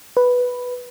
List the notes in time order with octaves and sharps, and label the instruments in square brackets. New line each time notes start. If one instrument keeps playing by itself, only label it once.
[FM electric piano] B4